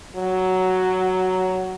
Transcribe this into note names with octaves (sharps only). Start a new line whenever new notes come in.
F#3